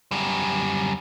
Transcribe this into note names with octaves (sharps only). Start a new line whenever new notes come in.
F#2 G3